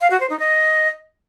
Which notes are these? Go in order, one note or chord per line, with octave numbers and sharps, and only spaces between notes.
F5
F#4
C5
D#4
D#5